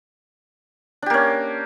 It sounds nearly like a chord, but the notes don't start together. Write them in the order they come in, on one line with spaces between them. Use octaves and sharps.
D4 G4 A#3 C#4